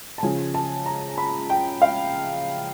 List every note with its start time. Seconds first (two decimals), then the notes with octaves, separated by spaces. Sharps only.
0.18 A5
0.23 C#3 F3 G#5
0.54 A5
0.86 A#5
1.18 B5
1.50 G5
1.82 F5